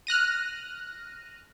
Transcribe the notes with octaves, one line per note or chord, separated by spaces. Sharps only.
F6 F#6 A#6 D#7